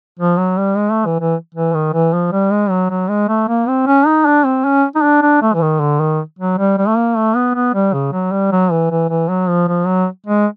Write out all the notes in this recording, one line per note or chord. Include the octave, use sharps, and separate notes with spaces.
F3
F#3
G3
G#3
A3
E3
E3
E3
D#3
E3
F3
G3
G#3
F#3
F#3
G#3
A3
A#3
C4
C#4
D#4
D4
C4
C#4
D#4
D4
D4
A3
E3
D#3
D3
D#3
F#3
G3
G3
A3
A#3
A3
B3
B3
G3
C#3
F#3
G3
F#3
E3
E3
E3
F#3
F3
F3
F#3
G#3